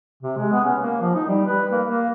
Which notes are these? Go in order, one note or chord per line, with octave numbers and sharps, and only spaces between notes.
C3
G#3
B3
C#4
A#3
F3
D#4
G3
B4
A#3
A#3